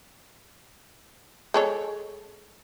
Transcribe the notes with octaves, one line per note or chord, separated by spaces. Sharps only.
G#3 A4 C#5